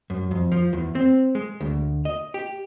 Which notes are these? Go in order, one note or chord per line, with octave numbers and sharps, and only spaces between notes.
F#2
F2
F3
E2
C4
G#3
D2
D#5
G4